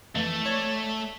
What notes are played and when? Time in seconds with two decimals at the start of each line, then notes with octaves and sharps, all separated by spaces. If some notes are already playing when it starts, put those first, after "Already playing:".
0.15 F2 E3 A3
0.46 C#5 D5